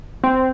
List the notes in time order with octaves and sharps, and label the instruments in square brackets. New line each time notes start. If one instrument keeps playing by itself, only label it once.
[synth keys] C4